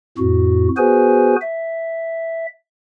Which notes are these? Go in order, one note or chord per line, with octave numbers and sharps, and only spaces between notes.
F2 A2 F#4
B3 F#4 G#4 B4 C5 G#5
E5